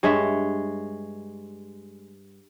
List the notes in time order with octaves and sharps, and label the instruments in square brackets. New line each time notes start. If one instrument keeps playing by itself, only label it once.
[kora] G2 G#3 C#5 E5